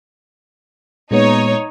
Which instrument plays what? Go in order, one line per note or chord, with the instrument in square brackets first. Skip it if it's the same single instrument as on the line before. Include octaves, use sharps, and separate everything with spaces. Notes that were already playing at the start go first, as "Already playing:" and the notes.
[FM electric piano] A#2 G#3 B3 [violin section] D#4 C#5